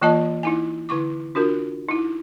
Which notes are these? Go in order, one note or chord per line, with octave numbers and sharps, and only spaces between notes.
E3 A#3 F4 D#5 A5
D#4 E4 G#5
D3 E4 C#6 D6
D4 F4 F#4 A#4
D#4 E4